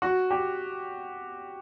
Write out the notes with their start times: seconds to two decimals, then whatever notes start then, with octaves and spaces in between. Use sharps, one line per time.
0.02 F#4
0.30 G4